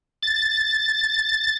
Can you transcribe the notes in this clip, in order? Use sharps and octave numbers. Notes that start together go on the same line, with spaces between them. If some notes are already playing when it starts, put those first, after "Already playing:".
A6